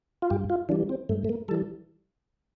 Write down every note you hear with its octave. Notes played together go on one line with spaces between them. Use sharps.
F4
G2 G4
F4
E3 G3 D4
C4
G2 A3
A3
A#3
E3 G3 A4